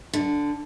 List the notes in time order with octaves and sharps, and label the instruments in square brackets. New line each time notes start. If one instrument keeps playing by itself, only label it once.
[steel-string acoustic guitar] D3